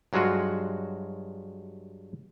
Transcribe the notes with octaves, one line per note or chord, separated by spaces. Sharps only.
G2 F#3 G#3 F4 F#4